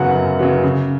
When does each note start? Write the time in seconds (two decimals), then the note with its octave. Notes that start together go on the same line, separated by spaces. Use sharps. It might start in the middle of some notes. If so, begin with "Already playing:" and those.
Already playing: F#2 C#3 F#3 B3 F#5
0.15 F#2
0.39 C#3 F#3 B3
0.64 C#3